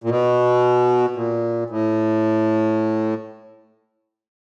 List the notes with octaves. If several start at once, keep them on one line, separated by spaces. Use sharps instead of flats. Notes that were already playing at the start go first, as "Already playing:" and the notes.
A#2
B2
A#2
A2